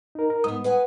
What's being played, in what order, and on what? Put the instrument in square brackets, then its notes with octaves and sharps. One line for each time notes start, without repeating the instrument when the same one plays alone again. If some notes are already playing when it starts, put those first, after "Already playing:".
[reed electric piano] D#4 A#4
A#4
[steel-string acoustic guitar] G#2 B3 [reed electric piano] D#6
[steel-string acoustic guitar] B4 F#5 G#5